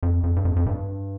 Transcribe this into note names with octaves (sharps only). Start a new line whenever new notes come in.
F2
F2
G2
F2
F2
G2